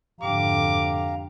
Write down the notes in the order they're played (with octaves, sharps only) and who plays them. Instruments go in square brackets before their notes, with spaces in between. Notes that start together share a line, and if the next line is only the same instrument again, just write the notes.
[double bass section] F2 G#2 D3 [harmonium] G4 F5 A#5 [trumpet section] D6